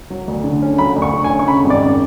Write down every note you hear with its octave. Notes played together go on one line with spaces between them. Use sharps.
F#3
D2
D3
C#4
F#3 B5
D2
C#6
D3
G#5
C#4
C#6
C#3 B5
G#1
D5
F#2